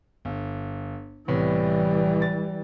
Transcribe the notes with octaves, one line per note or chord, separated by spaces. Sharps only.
G1
C2 A2 E3 G3 B3
A6